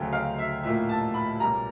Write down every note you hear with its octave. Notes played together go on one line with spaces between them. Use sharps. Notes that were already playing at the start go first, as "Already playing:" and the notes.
Already playing: D2 C#3 F#3 A3 G5
F5
E5
A#1 A2 F3 A#3 E5
A5
B5
B1 A#2 G3 A#3 A#5